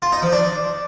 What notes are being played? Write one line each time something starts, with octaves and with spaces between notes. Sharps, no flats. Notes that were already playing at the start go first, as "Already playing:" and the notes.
F4
D#4
F3
D4